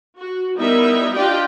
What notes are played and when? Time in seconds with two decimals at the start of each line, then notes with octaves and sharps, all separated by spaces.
0.17 F#4
0.56 G3 B3 D#4 E4 A#4 E5
1.15 D4 F4 G4 D5 D#5 G5